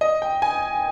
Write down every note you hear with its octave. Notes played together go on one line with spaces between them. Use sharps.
D#5
G5
G#5